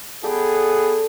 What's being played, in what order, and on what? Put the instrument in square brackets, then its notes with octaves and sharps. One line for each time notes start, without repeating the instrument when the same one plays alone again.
[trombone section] B3 G#4 [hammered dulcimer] A4 D5 G5